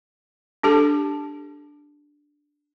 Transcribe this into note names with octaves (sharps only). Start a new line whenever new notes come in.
D4 G4 A4 A5